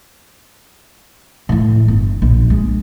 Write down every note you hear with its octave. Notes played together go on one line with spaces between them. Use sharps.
A2 E3
G1
A#1
G#3